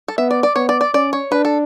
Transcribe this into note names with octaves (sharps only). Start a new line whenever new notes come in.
A4
B3 E5
D5
D5
B3 C#5
D5
D5
C#4 D5
C#5
D4 B4
A4